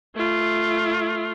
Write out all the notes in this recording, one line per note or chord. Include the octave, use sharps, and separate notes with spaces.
A3 F4